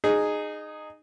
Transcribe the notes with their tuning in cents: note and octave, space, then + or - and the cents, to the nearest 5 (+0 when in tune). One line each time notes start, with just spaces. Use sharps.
D#4 -20 G#4 +0